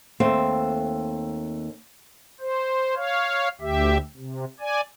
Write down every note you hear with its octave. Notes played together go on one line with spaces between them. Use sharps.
D#2 A3 C4
C5
C#5 F5
D2 G4 E5
C3
D5 G#5